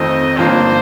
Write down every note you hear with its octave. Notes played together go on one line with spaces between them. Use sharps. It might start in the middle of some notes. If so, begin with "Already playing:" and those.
Already playing: F2 D#3 A3 C4 D#5
G1 G2 F3 A#3 C5